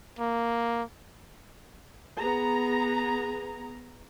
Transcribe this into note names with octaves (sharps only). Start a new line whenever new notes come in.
A#3
B3 G#4 A#5